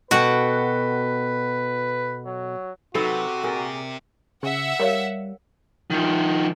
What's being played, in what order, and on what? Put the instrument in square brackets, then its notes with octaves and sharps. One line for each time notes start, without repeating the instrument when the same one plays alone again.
[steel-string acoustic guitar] B2 A4 G5 [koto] F#4 F#5 [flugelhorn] B4
[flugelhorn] F#3
[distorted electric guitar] C3 [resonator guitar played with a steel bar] F#3 D#4 B4 [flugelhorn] F#4 [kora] A4
[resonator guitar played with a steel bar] A#2 G#4 [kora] A#4 D5
[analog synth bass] C#3 [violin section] E5 F#5
[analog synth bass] G3 [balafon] A#4 C#5 F5
[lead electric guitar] D#3 F3